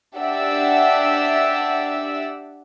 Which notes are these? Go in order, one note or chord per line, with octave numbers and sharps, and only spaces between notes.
D4 G4 D5 E5 F#5 E6